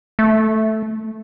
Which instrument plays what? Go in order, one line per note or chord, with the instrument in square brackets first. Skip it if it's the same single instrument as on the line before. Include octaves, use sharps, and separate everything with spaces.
[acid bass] A3